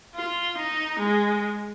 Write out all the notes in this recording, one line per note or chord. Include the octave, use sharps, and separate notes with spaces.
F4
D#4
G#3